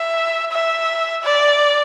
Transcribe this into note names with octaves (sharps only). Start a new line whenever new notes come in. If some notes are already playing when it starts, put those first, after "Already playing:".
Already playing: E5
E5
D5